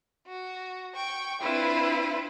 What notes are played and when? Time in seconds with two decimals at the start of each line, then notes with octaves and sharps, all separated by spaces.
0.27 F#4
0.96 G5 C#6
1.42 C4 D4 E4 F4 B4